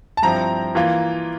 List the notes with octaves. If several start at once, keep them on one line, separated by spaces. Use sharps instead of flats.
A5
G2 F3 C4 E4 A#5
E3 A#3 F4